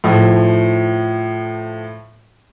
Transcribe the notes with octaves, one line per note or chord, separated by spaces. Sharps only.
A2 F3